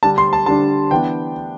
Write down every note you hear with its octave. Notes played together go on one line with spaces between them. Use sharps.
D3 G3 D4 A5
C6
A5
D3 G3 D4 A5
E3 B3 D4 G5